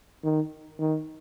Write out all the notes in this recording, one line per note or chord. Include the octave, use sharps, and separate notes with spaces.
D#3
D#3